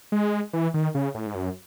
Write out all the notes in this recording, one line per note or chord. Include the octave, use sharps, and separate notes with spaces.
G#3
E3
D#3
C#3
A2
G#2
F#2